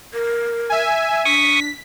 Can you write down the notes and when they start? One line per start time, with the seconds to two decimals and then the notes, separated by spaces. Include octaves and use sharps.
0.14 A#4
0.70 E5 G#5
1.25 D4 C#6 D#6 B6